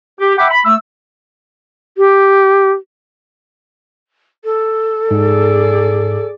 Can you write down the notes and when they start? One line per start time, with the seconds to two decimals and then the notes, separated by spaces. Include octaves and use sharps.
0.20 G4
0.38 E5 F#5 G5 B5 D6
0.50 B5
0.65 A3 E6
1.97 G4
4.44 A4
5.11 G#2 G#4 D5